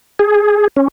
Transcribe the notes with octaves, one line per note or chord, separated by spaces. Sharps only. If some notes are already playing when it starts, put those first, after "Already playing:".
G#4
C#4